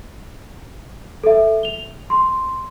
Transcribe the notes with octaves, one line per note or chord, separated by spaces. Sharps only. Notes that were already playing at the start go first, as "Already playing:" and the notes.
A4 E5
F7 G7
C6